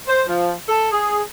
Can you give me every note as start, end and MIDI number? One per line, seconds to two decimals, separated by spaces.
0.06 0.21 72
0.26 0.51 53
0.67 0.88 69
0.90 1.19 68